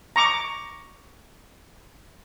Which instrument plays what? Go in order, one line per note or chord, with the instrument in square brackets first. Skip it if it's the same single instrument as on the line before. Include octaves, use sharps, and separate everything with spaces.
[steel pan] A#5 C#6 D6